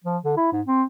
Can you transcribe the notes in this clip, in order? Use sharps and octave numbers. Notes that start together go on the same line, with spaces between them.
F3
D3
E4
G#2
C4